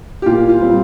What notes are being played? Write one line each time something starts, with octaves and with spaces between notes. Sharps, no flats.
G4
A#2 F4
F4
G3 C4